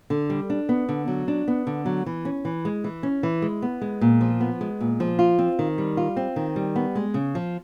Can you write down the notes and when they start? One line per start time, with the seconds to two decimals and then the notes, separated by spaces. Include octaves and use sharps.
0.10 D3
0.30 G3
0.50 D4
0.69 B3
0.89 D3
1.08 F#3
1.28 D4
1.48 B3
1.67 D3
1.86 F#3
2.06 E3
2.25 C#4
2.45 E3
2.65 G#3
2.84 E3
3.03 C#4
3.23 E3
3.42 G#3
3.62 B3
3.81 G#3
4.01 A#2
4.21 F3
4.40 B3
4.61 G#3
4.80 A#2
5.00 F3
5.19 F4
5.38 C4
5.59 D#3
5.78 G3
5.97 F4
6.17 C4
6.36 D#3
6.56 G3
6.76 B3
6.95 G#3
7.14 C#3
7.35 F3